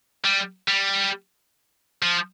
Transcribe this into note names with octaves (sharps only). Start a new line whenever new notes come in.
G3
G3
F3